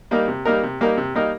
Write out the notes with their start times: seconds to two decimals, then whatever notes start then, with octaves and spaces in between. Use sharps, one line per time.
0.11 G3 A#3 D#4 A#4
0.28 C3
0.45 G3 A#3 D#4 A#4
0.63 C3
0.81 G3 A#3 D#4 A#4
0.97 C3
1.15 G3 A#3 D#4 A#4